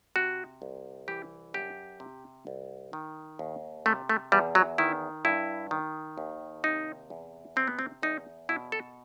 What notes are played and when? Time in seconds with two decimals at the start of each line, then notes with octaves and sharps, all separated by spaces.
0.16 C3 F#4
0.62 C2
1.08 E3 G4
1.54 F#2 G4
2.00 C3
2.47 C2
2.93 D#3
3.39 D#2
3.86 C3 A3
4.09 A3
4.32 E2 G3
4.55 F#3
4.78 D#3 E4
5.25 G2 E4
5.71 D#3
6.18 D#2
6.64 C3 D#4
7.10 E2
7.56 C3 C4
7.67 B3
7.79 C4
8.03 E2 D#4
8.49 B2 E4
8.72 A4